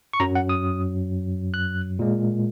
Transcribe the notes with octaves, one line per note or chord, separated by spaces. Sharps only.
C#6
F#2 F#3 A#5
F#5
D#6
F#6
A#2 G#3